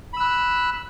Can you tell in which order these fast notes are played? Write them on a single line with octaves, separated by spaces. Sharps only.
B5 E6 F#6